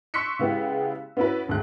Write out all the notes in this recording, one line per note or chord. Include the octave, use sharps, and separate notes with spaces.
C6 C#6 E6 F#6 B6 C#7
C#3 G#3 B3 E4 G4 G#4
B3 C#4 E4 F#4 B4
G#1 D2 G#3 F#6